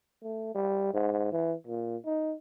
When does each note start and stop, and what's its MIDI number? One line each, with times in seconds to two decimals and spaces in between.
0.23 0.55 57
0.55 0.93 55
0.94 1.32 44
1.32 1.54 52
1.67 1.97 46
2.05 2.35 63